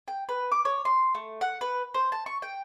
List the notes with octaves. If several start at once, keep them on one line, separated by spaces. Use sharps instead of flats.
G5
B4
D6
C#5
C6
A3
F#5
B4
C5
A5
C#6
G5